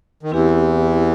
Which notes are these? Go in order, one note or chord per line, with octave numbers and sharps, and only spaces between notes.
D#3
E2 E3 C4 E4 G4